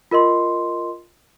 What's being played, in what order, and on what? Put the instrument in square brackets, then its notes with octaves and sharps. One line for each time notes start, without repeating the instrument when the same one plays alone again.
[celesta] F4 A#4 D#5 C6